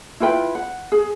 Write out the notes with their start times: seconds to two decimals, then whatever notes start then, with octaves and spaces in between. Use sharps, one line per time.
0.20 E4 F4 B4 G5
0.55 F#5
0.92 G#4